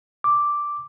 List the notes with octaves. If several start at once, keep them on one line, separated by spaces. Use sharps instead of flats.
D6